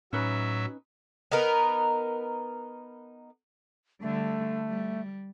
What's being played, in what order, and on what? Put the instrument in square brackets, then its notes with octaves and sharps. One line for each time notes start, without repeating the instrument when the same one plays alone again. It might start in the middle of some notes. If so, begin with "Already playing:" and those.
[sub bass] A2 [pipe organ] F#3 E5 [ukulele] C#4 D#4 B4
[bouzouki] B3 D#4 A#4 B4
[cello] D3 G3 [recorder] A3
[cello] G3